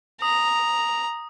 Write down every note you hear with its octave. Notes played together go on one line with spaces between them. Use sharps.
A#5 D#6